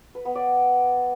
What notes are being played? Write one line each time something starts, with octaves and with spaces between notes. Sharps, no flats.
B4
B3
D5